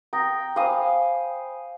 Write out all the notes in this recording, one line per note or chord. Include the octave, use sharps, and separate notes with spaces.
G5 A#5 D#6 A#6
C5 F5 G#5 B5 D#6